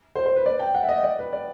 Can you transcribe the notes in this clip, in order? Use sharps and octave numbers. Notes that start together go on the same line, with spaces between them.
C5
C5
B4
D5
G5
F#5
E5
D#5
D5
B4
D5